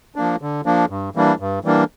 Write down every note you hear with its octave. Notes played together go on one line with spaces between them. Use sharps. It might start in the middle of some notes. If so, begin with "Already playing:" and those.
F3 A#3 D4
D3
F3 A#3 D4
G2
E3 G3 A#3 D4
G2
E3 G3 A#3 D4